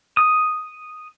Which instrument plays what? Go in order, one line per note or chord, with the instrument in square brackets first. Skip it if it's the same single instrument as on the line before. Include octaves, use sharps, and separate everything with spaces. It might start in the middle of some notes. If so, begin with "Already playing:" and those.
[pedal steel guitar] D#6